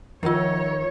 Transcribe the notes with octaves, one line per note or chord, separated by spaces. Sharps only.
D#3 F3 F4 G#4 C#5 F#5